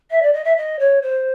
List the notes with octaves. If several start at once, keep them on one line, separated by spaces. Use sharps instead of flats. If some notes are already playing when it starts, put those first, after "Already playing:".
E5
D5
D#5
E5
D#5
C#5
C5